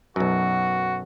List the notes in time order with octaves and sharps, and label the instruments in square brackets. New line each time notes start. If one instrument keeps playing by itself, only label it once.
[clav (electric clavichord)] B1 F#2 [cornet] F#4